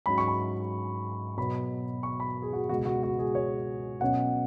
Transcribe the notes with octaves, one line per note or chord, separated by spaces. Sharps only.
G#2 F#3 C#4 B5
C#6
B5
B2 F#3 B3 B5
C#6
B5
G#4
F#4
C#2 B2 G#3 F#4
F#4
F#4
G#4
C#5
B2 F#3 C#4 F#5